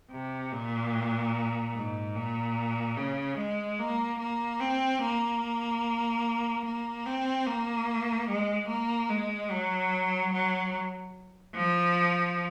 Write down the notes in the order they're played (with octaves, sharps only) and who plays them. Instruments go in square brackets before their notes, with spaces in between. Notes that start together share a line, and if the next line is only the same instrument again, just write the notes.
[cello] C3
A#2
G#2
A#2
C#3
G#3
A#3
A#3
C4
A#3
A#3
C4
A#3
G#3
A#3
G#3
F#3
F#3
F3